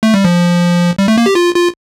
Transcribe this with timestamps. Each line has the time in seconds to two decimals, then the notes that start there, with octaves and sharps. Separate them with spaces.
0.03 A3
0.14 G3
0.24 F3
0.98 G3
1.08 A3
1.18 A#3
1.26 G4
1.35 F4
1.55 F4